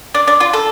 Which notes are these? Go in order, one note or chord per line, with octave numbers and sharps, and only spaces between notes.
D4
D4
F4
A4